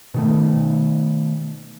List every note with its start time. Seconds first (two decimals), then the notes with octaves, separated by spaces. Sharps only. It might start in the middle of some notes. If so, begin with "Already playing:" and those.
0.14 B2 D#3 A3